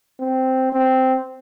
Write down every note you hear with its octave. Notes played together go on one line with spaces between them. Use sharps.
C4
C4